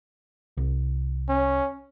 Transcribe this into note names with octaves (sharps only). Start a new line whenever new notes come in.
C2
C#4